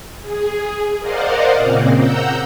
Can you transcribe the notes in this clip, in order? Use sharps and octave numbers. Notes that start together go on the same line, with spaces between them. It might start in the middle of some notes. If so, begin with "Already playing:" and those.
G#4
A#4 C5 D5 D#5 F5 F#5
A#2 C#3 A#3 C4
F#5 A#5 E6 G6